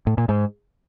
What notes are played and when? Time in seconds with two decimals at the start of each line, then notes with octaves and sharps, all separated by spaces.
0.07 A2
0.18 A#2
0.29 G#2